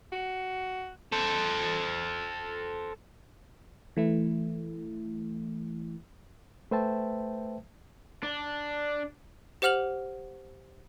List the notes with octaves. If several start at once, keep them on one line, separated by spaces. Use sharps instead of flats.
F#4
A4 C5
E3 A3 E4
A3 B4 C5 E5 G5 A5
D4
G4 C5 F#5 F6 F7 F#7